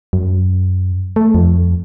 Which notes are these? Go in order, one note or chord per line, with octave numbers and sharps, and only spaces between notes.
F#2
A3
F2